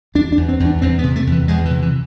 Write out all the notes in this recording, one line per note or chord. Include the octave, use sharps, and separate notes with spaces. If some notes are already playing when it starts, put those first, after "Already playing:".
E2 D4
D4
E2
C4
E2
D4
E2 C4
B3
C3
A3
E2
E3
E2 G#3
E3
C3
E3